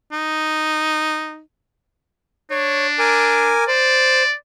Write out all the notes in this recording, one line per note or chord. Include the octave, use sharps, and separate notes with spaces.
D#4
D4 C#5
A#4 G#5 D6
C5 D5